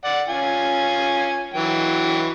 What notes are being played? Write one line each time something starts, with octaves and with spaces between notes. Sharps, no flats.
D5 F#5
C#4 F4 G#5
E3 F#3 G5